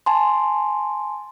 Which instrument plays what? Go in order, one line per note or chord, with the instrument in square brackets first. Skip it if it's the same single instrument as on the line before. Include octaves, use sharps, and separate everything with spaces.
[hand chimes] G#5 A5 C6